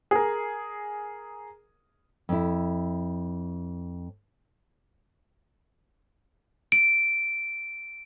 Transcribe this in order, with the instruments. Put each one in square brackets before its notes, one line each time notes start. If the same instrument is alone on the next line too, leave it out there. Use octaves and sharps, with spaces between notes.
[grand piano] G#4 A#4
[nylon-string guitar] F2 E4
[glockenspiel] D7